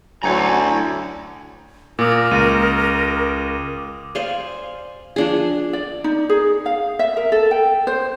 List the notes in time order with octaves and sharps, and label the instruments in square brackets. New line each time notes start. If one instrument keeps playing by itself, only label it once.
[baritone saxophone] D2 [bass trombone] F#3 [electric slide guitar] E4 A#5 [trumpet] G#5
[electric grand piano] A#2 [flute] A#4 [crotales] D6 D#6
[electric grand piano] C#2 [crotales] D#7
[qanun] C5 D5 F5 G#5
F3 D4 G#4
[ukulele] D5
D#4
G#4
F5
E5
A#4
A4
G5
C5